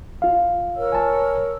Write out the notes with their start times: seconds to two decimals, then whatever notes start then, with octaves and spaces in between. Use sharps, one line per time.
0.22 F4 F5
0.75 A#4 C#5 E6
0.92 G#5 A5